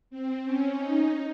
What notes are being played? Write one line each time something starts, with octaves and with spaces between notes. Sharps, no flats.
C4
C#4
D#4